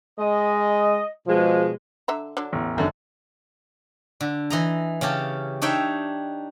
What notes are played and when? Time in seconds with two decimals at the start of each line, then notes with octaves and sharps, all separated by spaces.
0.19 G#3 D#5
1.27 B2 F3 G#3
2.08 D3 E5 A#5
2.37 D3 F#3 D4
2.53 A1 E2
2.76 G#1 F#2 D3
4.21 D3
4.50 E3 D#5 A#5
5.01 C#3 C#4 G4 A5
5.62 D4 D#4 C#5 E5 G5